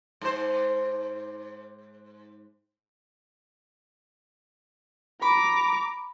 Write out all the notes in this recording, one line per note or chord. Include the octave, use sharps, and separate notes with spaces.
G#2 C5
A#5 B5 D6